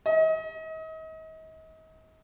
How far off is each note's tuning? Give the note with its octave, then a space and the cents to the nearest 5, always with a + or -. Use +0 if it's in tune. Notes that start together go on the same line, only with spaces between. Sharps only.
D#5 +40